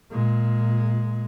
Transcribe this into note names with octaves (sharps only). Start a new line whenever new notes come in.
A#2 G#3